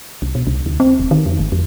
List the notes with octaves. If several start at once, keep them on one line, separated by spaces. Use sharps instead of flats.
C2
B2
C2
D2
C4
D#1
D#3
F2
G#1
F2